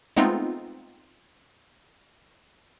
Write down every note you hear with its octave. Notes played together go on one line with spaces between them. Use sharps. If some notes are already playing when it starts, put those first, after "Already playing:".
G#3 A3 B3 C4 D#4 F4